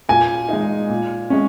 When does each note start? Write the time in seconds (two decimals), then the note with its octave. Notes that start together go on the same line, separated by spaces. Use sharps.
0.09 A#2 G#5
0.49 G#3 D#4
0.89 A#2
1.30 G#3 C#4